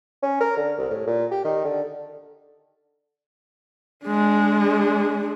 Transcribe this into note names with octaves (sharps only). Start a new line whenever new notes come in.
C#4
A#4
D3
C2
A2
A#2
G4
D#3
D3
G#3 D4